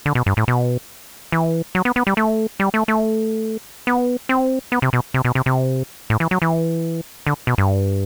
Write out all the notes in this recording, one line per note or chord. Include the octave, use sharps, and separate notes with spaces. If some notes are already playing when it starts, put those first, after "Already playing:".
D3
B2
G2
A2
B2
E3
F#3
B3
B3
G3
A3
G3
A3
A3
B3
C4
B3
C3
B2
C3
B2
C3
C3
A2
E3
F#3
E3
D3
B2
G2